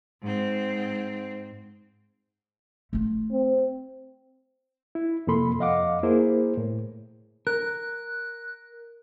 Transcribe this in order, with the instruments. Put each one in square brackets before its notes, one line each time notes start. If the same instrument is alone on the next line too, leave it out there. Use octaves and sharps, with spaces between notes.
[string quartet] G#2 C4
[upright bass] A3 F4
[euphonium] C4
[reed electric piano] E4
F2 C3 A#3 A4 B5 C6
F2 D#5 F5 F#5 D6
A#3 E4 G#4 A#4 C5
A2
[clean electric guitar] A#4 [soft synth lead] F#6